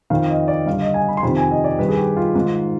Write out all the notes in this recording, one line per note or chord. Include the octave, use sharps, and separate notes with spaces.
F2 D#3 F5
D#5
D5
G2 D3 F5
D#5
G#5
B5
C6
F2 C3 D#3 B5
G#5
D#5
D5
G2 D#3 B4
G#4
G4
F4
G#2 D#3